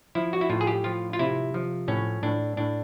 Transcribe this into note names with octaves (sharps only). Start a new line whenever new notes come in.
F3 E4
F#4
E4
A2 F4
G#4
G4
F3 F4
F4
C3 E4
F3
A2 C#4
A2 D4
A2 D4